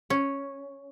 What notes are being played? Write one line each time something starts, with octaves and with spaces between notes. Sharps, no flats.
C#4